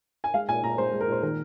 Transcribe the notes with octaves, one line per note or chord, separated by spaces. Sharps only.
G#5
G#3 F5
A#2 G#5
A#2 A#5
G#3 C5
G#3
A#4
A#2 C5
D#3 A#4